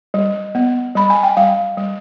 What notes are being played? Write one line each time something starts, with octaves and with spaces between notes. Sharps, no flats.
G3
B3
G3 B5
G#5
G5
G3 F5
G3